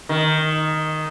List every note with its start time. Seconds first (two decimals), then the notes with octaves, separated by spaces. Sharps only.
0.09 D#3